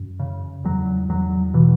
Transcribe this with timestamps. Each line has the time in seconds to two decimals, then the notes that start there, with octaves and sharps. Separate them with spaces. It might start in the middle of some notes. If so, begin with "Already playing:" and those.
Already playing: F#2
0.20 C#3
0.64 E2 F#3
1.09 E2 F#3
1.54 B2 E3